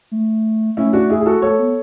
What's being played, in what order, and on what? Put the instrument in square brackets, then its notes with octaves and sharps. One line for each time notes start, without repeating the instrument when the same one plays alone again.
[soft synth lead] A3
[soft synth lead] A3 [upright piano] C#4 E4
[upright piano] D4 F#4
E4 G#4
G#4
F#4 A4
[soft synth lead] A3 [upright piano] A4 C#5
[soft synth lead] B3